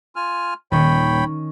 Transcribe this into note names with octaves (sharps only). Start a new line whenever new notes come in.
F4 G#5 F6
D#1 D#3 C#4 C#5 G5 B5